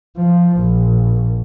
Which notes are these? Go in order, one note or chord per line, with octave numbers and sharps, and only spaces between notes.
F3
A#1